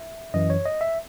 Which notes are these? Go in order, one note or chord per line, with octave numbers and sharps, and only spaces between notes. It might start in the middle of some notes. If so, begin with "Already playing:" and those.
Already playing: E5
F#2 E3 D#5
C#5
D#5
E5